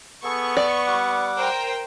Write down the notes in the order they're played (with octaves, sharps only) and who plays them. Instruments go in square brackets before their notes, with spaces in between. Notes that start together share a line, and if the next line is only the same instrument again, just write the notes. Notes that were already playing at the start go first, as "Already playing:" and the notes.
[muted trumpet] B3 [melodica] G#4 A4 [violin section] C#6
[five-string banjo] D5
[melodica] G3 F#5 D6
[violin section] A#4 C5 G5